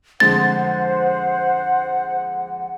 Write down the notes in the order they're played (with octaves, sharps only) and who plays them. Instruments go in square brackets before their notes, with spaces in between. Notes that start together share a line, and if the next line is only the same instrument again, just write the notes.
[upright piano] F2 D3 G#3 [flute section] C5 [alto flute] F#5 [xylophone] A6